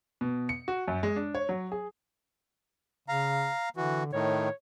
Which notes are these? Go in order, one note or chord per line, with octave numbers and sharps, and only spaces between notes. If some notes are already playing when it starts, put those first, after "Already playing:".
B2
C#7
F#4
F#2
G#3
D4
C#5
F#3
G#4
C#3 F5 A#5
D3 E3 F#4
A2 D#3 C#5